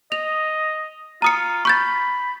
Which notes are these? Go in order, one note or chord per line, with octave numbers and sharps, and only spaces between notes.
D#5 F7
F4 A#5 D#6 C#7
B5 C#6 G6 A6